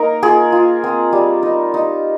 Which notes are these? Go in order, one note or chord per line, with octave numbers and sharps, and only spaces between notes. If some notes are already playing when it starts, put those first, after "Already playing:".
Already playing: A#3 D#4 A#4
F4 G#4
F4
C4
G3
D#4
D#4